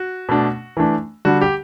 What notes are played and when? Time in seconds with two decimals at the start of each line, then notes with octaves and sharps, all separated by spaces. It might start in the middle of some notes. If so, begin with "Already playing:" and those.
Already playing: F#4
0.29 B2 A3 D4
0.77 E3 A3 D4
1.25 D3 G3 D4 F#4
1.41 G4